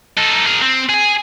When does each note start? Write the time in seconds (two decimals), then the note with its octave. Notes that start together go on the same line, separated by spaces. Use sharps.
0.17 D#4 A4
0.47 G#4 A#4
0.62 C4
0.90 G#4 G#5